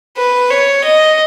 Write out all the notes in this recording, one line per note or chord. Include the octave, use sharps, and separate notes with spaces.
B4
C#5
D#5